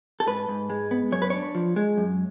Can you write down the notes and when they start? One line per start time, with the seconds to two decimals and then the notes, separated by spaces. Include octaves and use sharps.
0.20 A4
0.27 G#2 B4
0.49 G#2
0.70 G#3
0.91 B3
1.12 F#2 C#5
1.22 B4
1.30 D4 C#5
1.55 F3
1.76 G#3
1.98 F#2